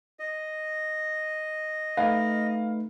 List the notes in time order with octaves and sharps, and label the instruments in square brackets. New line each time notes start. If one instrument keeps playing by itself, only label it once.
[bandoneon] D#5
[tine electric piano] A3 D#4 B4 [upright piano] F5